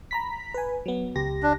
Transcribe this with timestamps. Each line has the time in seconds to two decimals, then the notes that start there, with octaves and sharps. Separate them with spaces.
0.11 A#5 B5 B6
0.54 B4 G#5
0.86 F#3 B3
1.15 C#2 G4 A#6
1.43 D4